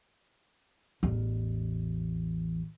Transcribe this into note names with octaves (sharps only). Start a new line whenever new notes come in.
A1 E2